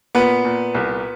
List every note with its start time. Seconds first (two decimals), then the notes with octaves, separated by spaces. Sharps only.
0.15 A#2 B3 B4
0.45 A#2
0.75 C2